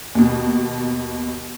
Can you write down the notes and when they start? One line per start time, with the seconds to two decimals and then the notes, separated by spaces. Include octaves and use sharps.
0.15 D#2 B2